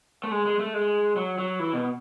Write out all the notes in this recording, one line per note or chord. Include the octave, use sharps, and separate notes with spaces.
A3
G#3
G#3
A3
G#3
F#3
F#3
E3
B2